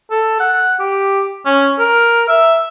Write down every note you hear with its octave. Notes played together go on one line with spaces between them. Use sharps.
A4
F#5
G4
C#4
A#4
E5